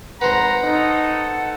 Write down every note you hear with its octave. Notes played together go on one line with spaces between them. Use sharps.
G#1 B4 C5 F#5 A#5
D#4 A4